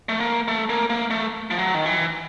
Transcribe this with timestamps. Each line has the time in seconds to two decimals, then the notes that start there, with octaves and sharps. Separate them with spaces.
0.09 A3
0.20 A#3
0.48 A3
0.69 A#3
0.90 A#3
1.11 A3
1.51 F3
1.59 F#3
1.75 D#3
1.86 E3